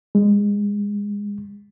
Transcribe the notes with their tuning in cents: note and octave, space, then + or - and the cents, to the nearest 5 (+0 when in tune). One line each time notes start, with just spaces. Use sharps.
G#3 -25